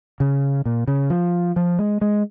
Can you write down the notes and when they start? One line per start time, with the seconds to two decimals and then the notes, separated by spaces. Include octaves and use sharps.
0.20 C#3
0.65 A#2
0.88 C#3
1.10 F3
1.56 F3
1.79 G#3
2.01 G#3